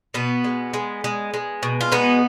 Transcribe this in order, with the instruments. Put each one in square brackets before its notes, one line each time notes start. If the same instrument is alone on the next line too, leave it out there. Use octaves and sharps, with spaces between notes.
[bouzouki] B2 B3
G#3
G#3
G#3
G#3
B2
F4
G#3 B3 D#4